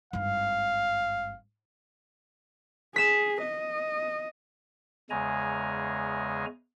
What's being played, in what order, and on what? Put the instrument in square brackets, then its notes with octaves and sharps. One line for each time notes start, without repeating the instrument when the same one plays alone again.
[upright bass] G#1 G2 [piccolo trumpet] F5
[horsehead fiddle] G#4 [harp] B6 E7
[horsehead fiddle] D#5
[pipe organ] E2 C#3 G#3 G#5 A#5